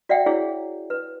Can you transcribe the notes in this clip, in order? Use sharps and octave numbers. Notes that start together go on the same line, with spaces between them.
F#4 D5 E5 F#5 G5
E4 F#4 G#4 C#5
B4